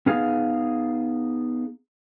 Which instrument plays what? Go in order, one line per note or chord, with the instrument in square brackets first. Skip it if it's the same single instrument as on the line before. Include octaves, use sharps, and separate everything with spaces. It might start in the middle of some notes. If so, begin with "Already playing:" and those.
[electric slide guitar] B3 D#4 G#4 F5